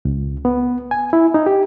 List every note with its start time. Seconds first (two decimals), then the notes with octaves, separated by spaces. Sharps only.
0.05 C#2
0.45 B3
0.91 G#5
1.13 E4
1.34 D#4
1.46 G4